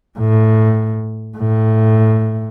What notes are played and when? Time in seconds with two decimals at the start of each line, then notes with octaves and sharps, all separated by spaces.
0.19 A2
1.38 A2